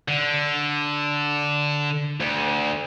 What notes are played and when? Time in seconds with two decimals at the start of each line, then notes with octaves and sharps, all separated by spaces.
0.08 D3
2.21 D2